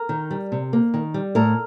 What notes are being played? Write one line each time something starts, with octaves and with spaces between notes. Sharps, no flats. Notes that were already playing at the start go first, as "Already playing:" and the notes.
Already playing: A#4
D#3
G3
C3
A#3
D#3
G3
A2 A#4